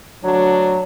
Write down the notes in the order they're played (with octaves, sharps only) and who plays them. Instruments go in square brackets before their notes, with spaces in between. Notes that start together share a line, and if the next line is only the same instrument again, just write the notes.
[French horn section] D2 D4 F#4 [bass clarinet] F#3